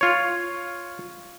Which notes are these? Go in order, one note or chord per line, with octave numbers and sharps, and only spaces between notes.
F4 C#5